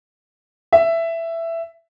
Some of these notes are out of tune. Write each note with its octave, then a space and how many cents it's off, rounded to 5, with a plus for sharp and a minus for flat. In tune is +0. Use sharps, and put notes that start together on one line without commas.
E5 +10